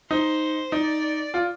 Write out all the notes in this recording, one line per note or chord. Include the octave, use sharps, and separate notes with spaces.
D#4 C5
D#4 D5
F4